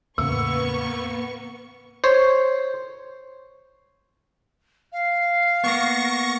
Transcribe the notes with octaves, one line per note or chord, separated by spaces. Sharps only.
E2 A2 C#3 A#3 B3 C#6 E6
C5 C#5
F5
A#3 B3 C#6 A#6